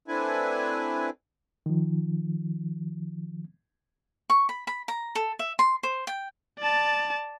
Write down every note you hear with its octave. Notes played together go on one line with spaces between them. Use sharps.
A3 C4 D4 E4 B4 G#5
D#3 F3
C#6
B5
B5
A#5
A4
E5
C6
C5
G5
D5 A5